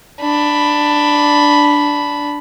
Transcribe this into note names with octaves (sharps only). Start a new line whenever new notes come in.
D4 B5